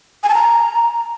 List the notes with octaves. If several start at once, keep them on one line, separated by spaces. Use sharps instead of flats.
G#5
A5
A#5